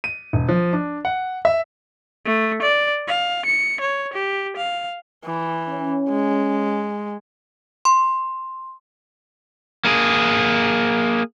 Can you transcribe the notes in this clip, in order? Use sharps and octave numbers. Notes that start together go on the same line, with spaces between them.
D#7
E1
F3
D4
F#5
E5
A3
D5
F5
C#7
C#5
G4
F5
E3
C#4
G#3
C6
A#3 G#4